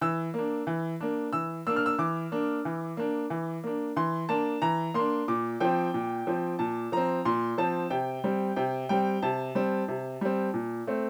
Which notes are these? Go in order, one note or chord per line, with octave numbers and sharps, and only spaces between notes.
E3 E6
A#3 D4
E3
A#3 D4
E3 E6
A#3 D4 E6
F6
E6
E3 D6
A#3 D4
E3
A#3 D4
E3
A#3 D4
E3 C6
A#3 D4 A5
E3 A#5
A#3 D4 C6
A#2 D6
F3 C4 G5
A#2
F3 C4
A#2 A5
F3 C4 A#5
A#2 C6
F3 C4 A5
C3 G5
G3 C4
C3 G5
G3 C4 G5
C3 A5
G3 C4
C3
G3 C4
A#2
A3 C4